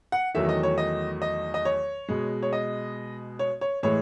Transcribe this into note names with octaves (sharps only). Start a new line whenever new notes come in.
F#5
E2 D#3 F#3 A3 E5
D#5
C#5
D#5
D#5
D#5
C#5
B2 G#3
C#5
D#5
C#5
C#5
A2 E3 G#3 C#5